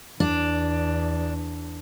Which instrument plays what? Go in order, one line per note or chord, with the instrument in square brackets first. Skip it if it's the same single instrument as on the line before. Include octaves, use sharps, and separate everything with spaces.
[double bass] E2 [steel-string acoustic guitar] D4